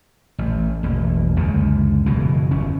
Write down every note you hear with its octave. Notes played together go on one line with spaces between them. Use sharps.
A1
E1 A1 A#3
C#2 F#2 D3
F#1 B2 E3
G1 C#4